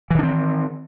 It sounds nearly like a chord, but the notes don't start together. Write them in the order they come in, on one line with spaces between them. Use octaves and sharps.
E3 D#3 D4 C4